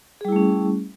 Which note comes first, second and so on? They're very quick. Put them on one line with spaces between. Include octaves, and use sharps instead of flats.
G#4 G3 E4 A3 C#4